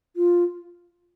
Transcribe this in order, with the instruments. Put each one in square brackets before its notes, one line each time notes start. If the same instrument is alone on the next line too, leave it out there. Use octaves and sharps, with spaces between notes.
[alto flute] F4